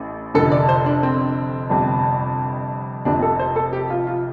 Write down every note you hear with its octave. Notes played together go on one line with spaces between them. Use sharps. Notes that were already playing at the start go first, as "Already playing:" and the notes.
Already playing: A1 A2
F1 F2 D3 A4
D5
C5
D4
C4
G1 F2 C3
F1 F2 C3 D4
A4
C5
A4
G4
F4
F4